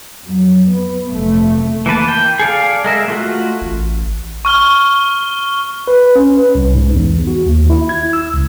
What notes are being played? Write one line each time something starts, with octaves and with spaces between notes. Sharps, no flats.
F2 F#3
B3
F1 A3
E3 A#3 B4 A5
G5
G#4 A4 D5 F5
G#3 A#4 E5
A3 F4 F#4
A1
C#6 F6 G7
B4
C#4
B4
C2
G#2
E2
F#4
D#2
E4
G#6
E6
C#2